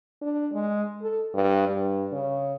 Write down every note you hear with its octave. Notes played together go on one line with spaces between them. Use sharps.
D4
G#3
A4
G2
G2
C#3